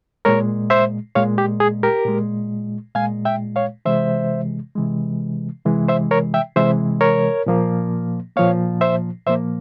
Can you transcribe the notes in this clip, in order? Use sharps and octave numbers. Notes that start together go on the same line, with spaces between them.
A#2 G#3 A#4 C#5
C5 E5
A#2 G#3 C#5 F5
G4
G#4
G4 A#4
A#2 G#3
A#2 G#3 F5 G#5
E5 G5
C#5 F5
C3 E3 G#3 C5 E5
C3 E3 G#3
C3 E3 G#3
C5 E5
A#4 C#5
E5 G5
C3 E3 G#3 C5 E5
A#4 C#5
A#2 F3 A#3
A#2 F3 A#3 C#5 F5
C5 E5
A#2 F3 A#3 C5 E5